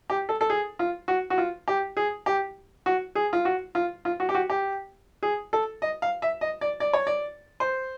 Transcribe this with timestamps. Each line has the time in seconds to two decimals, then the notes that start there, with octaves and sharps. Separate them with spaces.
0.10 G4
0.29 A4
0.41 A4
0.50 G#4
0.79 F4
1.08 F#4
1.30 F#4
1.38 F4
1.68 G4
1.97 G#4
2.26 G4
2.86 F#4
3.15 G#4
3.33 F4
3.45 F#4
3.75 F4
4.05 F4
4.20 F#4
4.29 G4
4.34 F#4
4.50 G4
5.23 G#4
5.53 A4
5.82 D#5
6.02 F5
6.22 E5
6.41 D#5
6.61 D5
6.80 D5
6.93 C#5
7.07 D5
7.60 C5